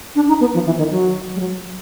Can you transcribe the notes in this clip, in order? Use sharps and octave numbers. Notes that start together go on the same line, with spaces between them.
D4
D#4
B3
F3
E3
D#3
F#3
G3
F#3